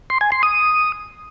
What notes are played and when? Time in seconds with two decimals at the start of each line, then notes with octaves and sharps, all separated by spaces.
0.10 C6
0.21 G#5
0.32 C6
0.43 D#6